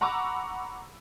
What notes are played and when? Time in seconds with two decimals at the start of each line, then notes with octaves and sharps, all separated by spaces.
0.01 F#5 A#5 B5 C#6 D6 E6